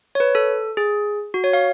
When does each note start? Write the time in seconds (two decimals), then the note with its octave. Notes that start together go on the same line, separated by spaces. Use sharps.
0.15 C#5
0.20 B4
0.35 A4
0.77 G#4
1.34 F#4
1.44 C#5
1.53 F5